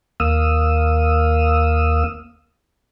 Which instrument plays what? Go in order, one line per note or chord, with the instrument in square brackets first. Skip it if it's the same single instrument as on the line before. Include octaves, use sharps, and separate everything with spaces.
[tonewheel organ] D#2 A#3 F5 D#6 E6